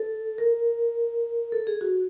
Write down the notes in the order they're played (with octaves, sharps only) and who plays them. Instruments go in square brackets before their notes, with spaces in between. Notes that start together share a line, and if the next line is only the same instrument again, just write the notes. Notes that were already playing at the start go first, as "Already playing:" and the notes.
Already playing: [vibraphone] A4
A#4
A4
G#4
F#4